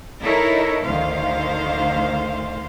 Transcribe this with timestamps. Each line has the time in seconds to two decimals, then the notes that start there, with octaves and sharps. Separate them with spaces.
0.22 D#4 E4 A4 A#4 C#5
0.82 D2 D#3 C5 F5